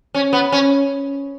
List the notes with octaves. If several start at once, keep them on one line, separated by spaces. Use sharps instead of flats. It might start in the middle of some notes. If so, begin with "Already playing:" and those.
C#4
B3
C#4